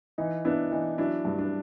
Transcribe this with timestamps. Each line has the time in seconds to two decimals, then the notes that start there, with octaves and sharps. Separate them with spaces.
0.18 E3 D#4
0.45 B3 D4 E4
0.71 E3 D#4
0.98 F#3 D4 E4
1.25 G2
1.38 D4